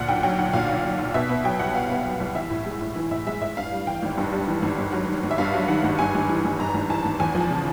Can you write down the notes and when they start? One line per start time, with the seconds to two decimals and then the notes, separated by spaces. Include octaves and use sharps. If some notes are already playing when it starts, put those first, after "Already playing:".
Already playing: D2 A#2 F#5
0.09 B1 G5
0.23 F#3 G5
0.39 B1 F#5
0.53 A#2 F5
0.69 B1
0.84 F#3
0.99 B1
1.14 B2 E5
1.29 B3
1.44 F#3 G5
1.59 C2 F#5
1.74 B2 F5
1.90 B3
2.05 F#3
2.20 C2
2.35 E3 E5
2.50 A2
2.66 G#3
2.81 A2
2.96 E3
3.11 A2 E5
3.27 G#3 E5
3.41 A2 E5
3.57 G2 F5
3.72 G3
3.87 E3 G5
4.03 G#1
4.17 G2
4.32 G3
4.48 E3
4.63 G#1
4.78 G2
4.93 F#3
5.08 D#3
5.23 G#1
5.31 E5
5.38 G2 F5
5.54 F#3
5.68 D#3 F#5
5.84 G#1
5.99 G2 G#5
6.15 G#1
6.29 E3
6.44 G#1
6.59 G2 A#5
6.74 G#1
6.90 E3 A5
7.05 G#1
7.20 E2 G#5
7.35 F3
7.41 A5
7.51 C#3